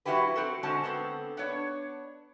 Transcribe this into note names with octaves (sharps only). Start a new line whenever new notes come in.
F3 F#3 E4 F#4 G4 B4
C4 F#4 A4
D3 G#3 C#4 F#4 C5 A5
D3 B3 C4 A4
B3 D4 C#5